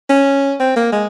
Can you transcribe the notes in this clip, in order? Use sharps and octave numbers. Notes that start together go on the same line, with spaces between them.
C#4
C4
A#3
G#3